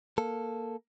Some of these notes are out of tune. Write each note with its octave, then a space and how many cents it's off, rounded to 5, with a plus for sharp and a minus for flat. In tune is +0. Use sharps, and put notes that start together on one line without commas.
A#3 +0 A4 +0